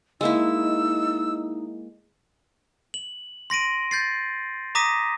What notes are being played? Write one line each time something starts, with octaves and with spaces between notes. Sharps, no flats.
G#3 A#3 D#4 E4 E6
F#7
C6 A#6 D7 D#7
G6 A6 C7
A#5 D6 D#6 A#6 B6 D#7